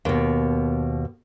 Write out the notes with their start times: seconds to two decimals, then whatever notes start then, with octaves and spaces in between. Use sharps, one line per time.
0.05 D#2 B2